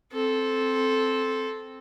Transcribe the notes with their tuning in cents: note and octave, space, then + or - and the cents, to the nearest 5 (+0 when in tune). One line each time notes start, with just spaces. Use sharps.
C4 +0 A4 -10